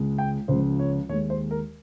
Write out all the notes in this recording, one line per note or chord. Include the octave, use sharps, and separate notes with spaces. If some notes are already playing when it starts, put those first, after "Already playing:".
Already playing: C#2 C#3 G#3
G5
C#2 C#3 F3 G#3 C5
C#5
D#2 D#3 G#3 C#5
C5
A#4